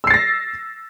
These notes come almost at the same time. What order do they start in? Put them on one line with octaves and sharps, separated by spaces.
E6 C7 A6 A#6